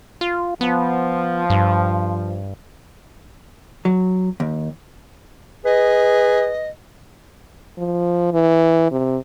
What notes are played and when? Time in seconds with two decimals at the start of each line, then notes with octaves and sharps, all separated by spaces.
0.21 F4
0.61 F3 B3
1.50 G2
3.85 F#3
4.40 D#2
5.65 G#4 B4 D#5
7.78 F3
8.33 E3
8.91 C3